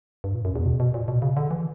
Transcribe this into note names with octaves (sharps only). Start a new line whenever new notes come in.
G2
A#2
F#2
E2
B2
B2
A#2
B2
C#3
D3
E3